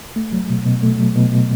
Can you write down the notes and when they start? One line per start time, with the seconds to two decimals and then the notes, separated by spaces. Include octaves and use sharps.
0.16 A3
0.32 F#3
0.49 B2
0.66 B2
0.82 A3
0.99 F#3
1.15 B2
1.32 B2